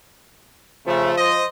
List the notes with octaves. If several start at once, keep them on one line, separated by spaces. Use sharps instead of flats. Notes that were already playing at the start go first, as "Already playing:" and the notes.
C#3 F3 A3
C5 D#5